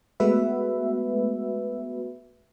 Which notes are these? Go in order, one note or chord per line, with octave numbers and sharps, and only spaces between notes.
G#3 A3 B3 F#4 B4 E5